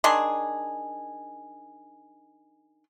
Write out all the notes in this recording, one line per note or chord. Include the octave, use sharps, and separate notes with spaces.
D#3 D4 G#4 C6